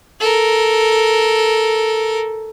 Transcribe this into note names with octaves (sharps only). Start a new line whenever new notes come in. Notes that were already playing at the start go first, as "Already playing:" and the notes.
A4 A#4